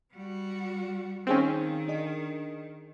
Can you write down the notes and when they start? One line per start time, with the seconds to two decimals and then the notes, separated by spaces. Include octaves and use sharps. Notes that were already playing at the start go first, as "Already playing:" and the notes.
0.13 G3 F#4
1.27 D#3 C4 C#4 D#4 G#4 F5
1.88 D4 G#4 D#5